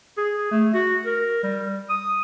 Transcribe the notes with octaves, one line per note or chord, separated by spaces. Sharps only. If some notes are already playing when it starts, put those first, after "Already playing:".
G#4
A3
F#4
A#4
G3
D#6